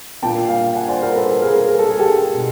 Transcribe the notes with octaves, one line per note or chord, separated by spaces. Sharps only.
A#2 G5 A5
F5 G5
F#5 G#5
C5 D5
A#4 C5
A4 B4
A4 B4
G#4 A#4
G#4
A#4
A4
G#4
G4 A4
B2